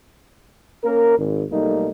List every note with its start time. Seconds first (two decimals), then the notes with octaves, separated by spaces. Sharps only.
0.84 A#3 C#4 A#4
1.18 G#1
1.51 B1 G3 A3 A#3 D#4